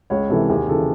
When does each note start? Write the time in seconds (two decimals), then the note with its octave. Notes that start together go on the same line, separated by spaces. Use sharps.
0.10 C#2 C#5
0.29 C3 E3 A4
0.49 D#2 G#4
0.68 C#3 E3 A4